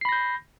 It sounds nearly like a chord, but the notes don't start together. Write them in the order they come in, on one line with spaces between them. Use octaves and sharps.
C7 B5 A#6 G6